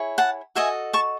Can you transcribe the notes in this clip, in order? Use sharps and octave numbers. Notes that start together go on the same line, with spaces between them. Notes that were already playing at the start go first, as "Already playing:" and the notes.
Already playing: E4 G#4 C#5
F#5 A5
F#4 A4 D#5 E5 G#5
A5 C#6